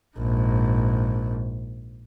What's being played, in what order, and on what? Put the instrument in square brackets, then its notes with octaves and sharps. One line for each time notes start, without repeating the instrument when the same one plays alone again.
[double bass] A#1 G#2